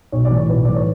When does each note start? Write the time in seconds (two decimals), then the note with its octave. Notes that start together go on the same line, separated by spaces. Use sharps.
0.12 B1 C#5
0.25 D5
0.31 A2 E3
0.37 C#5
0.49 B1 B4
0.65 A2 E3 D5
0.76 C#5